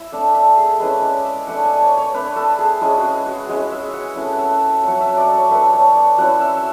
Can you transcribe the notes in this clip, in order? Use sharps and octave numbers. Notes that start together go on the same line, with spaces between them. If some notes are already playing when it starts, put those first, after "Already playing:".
Already playing: E4 E5
A3 D4 F#5
E5
G#4
A4
G#3 C#4 E4 B4
D5
E5
A3 D4 F#5
G#5
C#5
C#5
A3 D4 B4
A4
G#4
G#3 C#4 E4 G#4
F#4
G#4
F#4
G#3 C#4 E4 G#4
E5
G#5
F#5
A3 C#4 E4 F#5
F#5
E5
E5
F#5
F#3 A3 C#4 F#5
E5
D5
C#5
A3 D4 B4
C#5
D5
F#3 C#4 E4 F#5
E5
E5